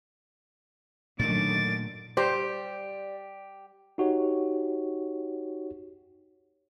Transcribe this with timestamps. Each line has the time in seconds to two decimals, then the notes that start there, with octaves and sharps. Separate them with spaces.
1.19 F#2 A#2 D3 D#3 A3 D6 A6
2.17 G3 G4 C5 D5
3.98 D#4 F#4 G4 C#5